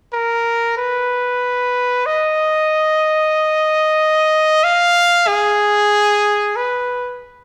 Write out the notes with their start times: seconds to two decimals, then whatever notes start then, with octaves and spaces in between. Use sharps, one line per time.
0.13 A#4
0.77 B4
2.06 D#5
4.64 F5
5.28 G#4
6.56 B4